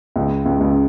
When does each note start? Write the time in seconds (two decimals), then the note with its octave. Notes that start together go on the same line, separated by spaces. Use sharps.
0.16 C#2 C#3
0.45 C#2 C#3
0.60 C#2 C#3